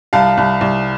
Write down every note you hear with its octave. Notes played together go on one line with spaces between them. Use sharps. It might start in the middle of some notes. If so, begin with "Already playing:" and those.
C2 F5 A5
C2
C2